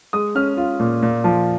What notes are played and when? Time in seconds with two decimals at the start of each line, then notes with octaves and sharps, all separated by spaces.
0.13 G#3 D#6
0.35 C#4 F6
0.57 F4
0.80 A#2
1.03 A#2
1.24 F3